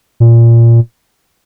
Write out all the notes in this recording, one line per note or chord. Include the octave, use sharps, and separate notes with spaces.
A#2